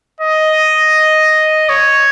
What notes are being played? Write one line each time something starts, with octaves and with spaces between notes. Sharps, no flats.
D#5
C#5